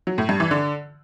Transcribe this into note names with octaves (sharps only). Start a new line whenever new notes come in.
F#3
A2
G2
E3
D3